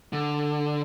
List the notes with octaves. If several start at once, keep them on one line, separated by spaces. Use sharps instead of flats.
D3